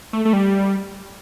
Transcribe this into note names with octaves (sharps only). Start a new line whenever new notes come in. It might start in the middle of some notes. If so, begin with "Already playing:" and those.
A3
A3
G3